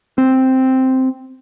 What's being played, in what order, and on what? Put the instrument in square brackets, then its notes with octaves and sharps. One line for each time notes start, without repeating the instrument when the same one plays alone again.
[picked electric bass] C4